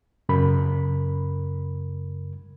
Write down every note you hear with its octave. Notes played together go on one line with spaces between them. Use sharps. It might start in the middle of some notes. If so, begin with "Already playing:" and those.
F#2 C#3 A#4 B5